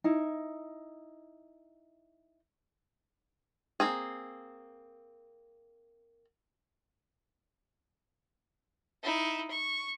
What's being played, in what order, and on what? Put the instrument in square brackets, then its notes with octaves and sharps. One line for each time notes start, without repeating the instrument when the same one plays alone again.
[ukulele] D#4 E4
[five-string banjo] A#3 C4 G#4
[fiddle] D#4 E4
C#6